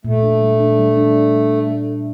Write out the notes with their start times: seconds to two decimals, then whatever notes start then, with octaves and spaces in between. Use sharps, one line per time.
0.05 A#2 A3
0.23 D4
0.42 G3
0.60 D4
0.79 G3
0.97 D4